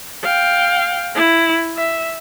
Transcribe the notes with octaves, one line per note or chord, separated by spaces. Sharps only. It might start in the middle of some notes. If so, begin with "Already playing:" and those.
F5 G5
E4
E5